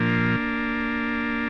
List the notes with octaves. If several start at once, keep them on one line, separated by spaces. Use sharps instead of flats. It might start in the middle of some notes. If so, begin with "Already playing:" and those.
Already playing: A#2 F3 A#3 D4